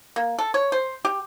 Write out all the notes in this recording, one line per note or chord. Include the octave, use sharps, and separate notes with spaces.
A#3
A4
C#5
C5
G4